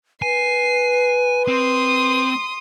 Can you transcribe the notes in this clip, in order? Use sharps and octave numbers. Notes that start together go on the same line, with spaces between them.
B4 G#5 C7
C4 C6 D#6